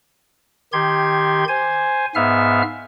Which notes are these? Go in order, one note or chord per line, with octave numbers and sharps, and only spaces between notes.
D#3 G4 C6 G#6
C5 G#5
G#2 B3 E5 F5 F6